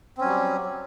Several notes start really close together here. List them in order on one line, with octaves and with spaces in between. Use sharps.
C4 C#4 F#3 G3